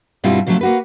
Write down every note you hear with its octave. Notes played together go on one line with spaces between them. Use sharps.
G2 B2 G3 C4 E4 F4
C#3 F3 F#3 G#3 A3
A#3 F#4 B4